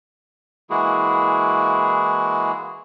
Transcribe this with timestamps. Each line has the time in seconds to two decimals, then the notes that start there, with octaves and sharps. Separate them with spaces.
0.70 E3 G#3 A#3 E4 F#4 G#4